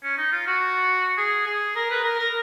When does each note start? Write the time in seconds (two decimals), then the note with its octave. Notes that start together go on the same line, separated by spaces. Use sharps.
0.03 C#4
0.18 D#4
0.32 F4
0.47 F#4
1.18 G#4
1.46 G#4
1.76 A#4
1.91 B4
2.04 A#4
2.19 A#4